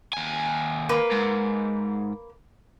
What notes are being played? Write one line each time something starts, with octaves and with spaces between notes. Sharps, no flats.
D#2 G#5
A#3 B4
G#2